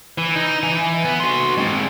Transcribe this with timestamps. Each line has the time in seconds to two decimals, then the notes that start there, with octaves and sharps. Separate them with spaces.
0.18 E3
0.36 D#4
0.63 E3 G#5
1.05 B3
1.20 F#4 C6
1.58 G#3 C4